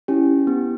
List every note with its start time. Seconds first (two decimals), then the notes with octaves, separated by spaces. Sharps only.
0.08 C#4 E4 G4
0.47 B3 G4